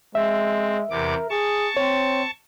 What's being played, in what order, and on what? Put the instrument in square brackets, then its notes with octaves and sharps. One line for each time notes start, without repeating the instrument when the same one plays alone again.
[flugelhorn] G#3 [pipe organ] C4 [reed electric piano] E5
[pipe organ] E2 C3 D6 [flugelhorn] A#4
[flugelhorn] G#4 [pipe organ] A5 C#6
[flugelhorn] C4 [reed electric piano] C#5